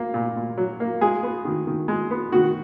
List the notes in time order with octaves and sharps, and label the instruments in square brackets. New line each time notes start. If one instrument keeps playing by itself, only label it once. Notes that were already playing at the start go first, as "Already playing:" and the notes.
Already playing: [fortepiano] A#3
A#2
A#2
F#3
A#3
G#3 G#4
B3
D#3
D#3
G#3
B3
D#3 F#4